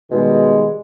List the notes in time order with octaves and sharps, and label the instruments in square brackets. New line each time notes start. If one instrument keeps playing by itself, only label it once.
[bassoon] B2 [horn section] D#3 G3 G#3